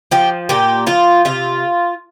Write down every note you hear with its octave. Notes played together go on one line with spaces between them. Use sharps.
F3 G4
A#2 G4
F3 F4
C3 F4